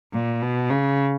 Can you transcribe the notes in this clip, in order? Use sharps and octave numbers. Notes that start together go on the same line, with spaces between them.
A#2
B2
C#3